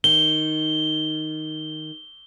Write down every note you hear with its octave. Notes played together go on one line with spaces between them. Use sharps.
D#3 G7